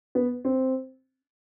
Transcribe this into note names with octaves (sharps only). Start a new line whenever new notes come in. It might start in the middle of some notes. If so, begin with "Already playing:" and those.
B3
C4